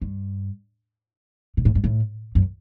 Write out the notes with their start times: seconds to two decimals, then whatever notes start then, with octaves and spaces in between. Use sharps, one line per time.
0.01 G2
1.57 B2
1.65 A2
1.75 G2
1.84 A2
2.35 F#2